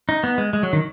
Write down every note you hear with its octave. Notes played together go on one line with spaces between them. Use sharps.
D#4
B3
G#3
G#3
F#3
D#3